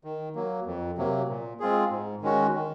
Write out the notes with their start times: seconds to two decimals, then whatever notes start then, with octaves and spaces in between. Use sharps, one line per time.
0.04 D#3
0.35 F#3 A#3
0.66 F2
0.98 C3 F#3 A#3
1.28 A#2
1.60 G#3 C4 F4 G#4
1.91 G#2
2.22 D#3 G#3 C#4 F#4
2.53 D#3